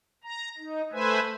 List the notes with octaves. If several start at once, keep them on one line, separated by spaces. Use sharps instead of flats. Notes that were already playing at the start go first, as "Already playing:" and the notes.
A#5
D#4
A3 B4 C5 E5 G#5